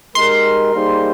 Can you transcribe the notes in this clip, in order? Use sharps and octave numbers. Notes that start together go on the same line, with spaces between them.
G#3 D#4 G4 A#4 C6
G3 A#3 D#4 G#4 C5